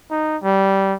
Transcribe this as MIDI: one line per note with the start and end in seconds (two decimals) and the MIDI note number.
0.11 0.37 63
0.43 0.94 55